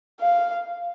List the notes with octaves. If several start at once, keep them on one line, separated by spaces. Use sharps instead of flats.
F5